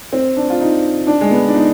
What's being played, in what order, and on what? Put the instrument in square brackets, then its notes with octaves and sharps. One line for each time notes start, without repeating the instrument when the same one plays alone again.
[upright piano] C4
D4
F4
D#4
D4
G#3
B3
D4
D#4